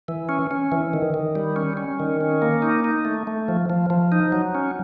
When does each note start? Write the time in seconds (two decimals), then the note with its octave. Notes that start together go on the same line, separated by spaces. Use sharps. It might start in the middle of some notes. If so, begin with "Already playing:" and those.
0.08 E3
0.29 C#4
0.51 C#4
0.72 E3
0.93 D#3
1.14 D#3
1.35 G3
1.56 C#4
1.77 C#4
2.00 D#3
2.21 C#4
2.42 A#3
2.62 D#4
2.84 D#4
3.05 A3
3.27 A3
3.48 F3
3.70 F3
3.90 F3
4.12 D#4
4.32 F#3
4.55 C#4